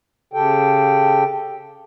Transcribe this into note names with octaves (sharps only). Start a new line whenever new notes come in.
C#3 G4 A4 G5